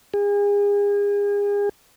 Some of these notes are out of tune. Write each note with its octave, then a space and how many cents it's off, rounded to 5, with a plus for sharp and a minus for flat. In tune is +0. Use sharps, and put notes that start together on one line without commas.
G#4 -35